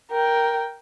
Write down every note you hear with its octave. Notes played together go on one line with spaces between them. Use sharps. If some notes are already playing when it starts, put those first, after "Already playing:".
A#4 G5